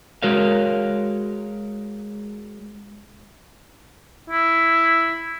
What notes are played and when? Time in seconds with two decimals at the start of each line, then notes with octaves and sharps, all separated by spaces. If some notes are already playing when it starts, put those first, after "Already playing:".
0.22 G#3 F#4 A#4 C#5 F5
4.30 E4